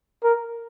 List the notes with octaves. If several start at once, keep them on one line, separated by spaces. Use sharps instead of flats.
A#4